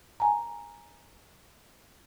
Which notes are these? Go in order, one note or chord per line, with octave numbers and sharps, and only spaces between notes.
G#5 A#5